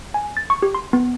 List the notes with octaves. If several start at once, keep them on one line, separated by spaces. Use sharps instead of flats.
G#5
A6
C#6
G4
C6
B3